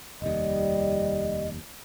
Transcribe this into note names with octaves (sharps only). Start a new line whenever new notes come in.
F1 D#2 G3 D#5